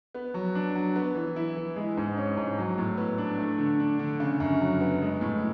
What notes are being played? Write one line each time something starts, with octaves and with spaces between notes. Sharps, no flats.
B3
F#3
D4
F#3
B3
E3
E4
E3
G#3
G#2
C#4
G#2
F#3
A2
B3
D4
A3
D3
D4
D3
C#3
F#2
F#3
B3
G#3
A2